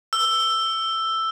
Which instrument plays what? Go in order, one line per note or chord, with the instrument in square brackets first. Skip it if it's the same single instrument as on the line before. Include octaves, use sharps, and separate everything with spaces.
[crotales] E6